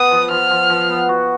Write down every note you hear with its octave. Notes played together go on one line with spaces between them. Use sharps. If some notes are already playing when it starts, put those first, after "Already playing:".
Already playing: B3 D#6
F3
F3 F6
F3
F3
B3
F#4